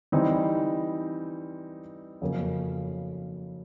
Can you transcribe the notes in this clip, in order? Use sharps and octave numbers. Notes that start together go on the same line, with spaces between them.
E3 G3 C4 D#4
F2 C#3 F#3 A#3